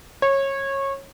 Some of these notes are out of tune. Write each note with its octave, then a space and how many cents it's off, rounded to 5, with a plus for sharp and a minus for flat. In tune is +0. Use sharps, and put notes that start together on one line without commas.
C#5 -20